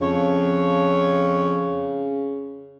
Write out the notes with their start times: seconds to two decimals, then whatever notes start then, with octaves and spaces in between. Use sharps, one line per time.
0.01 F2 C#3 C#5